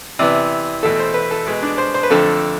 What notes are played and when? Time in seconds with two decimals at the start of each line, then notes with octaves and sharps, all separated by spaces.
0.19 C3 E3 B3 D5
0.83 E2 B2 A3 A4
0.99 C5
1.14 B4
1.31 A4
1.46 B2 G#3 B3
1.63 D4
1.78 C5
1.94 C5
2.03 B4
2.10 F2 D3 A3 C4 A4